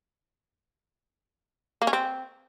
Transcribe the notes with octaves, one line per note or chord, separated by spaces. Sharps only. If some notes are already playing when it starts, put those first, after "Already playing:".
A#3
C#4
C4